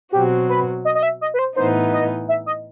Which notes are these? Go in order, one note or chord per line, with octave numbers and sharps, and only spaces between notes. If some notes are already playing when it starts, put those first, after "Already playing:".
B2 F#3 C4 F#4 G4
B4
D#5
D#5
E5
D#5
B4
C5
A2 E3 B3 D#4 C5
D#5
E5
D#5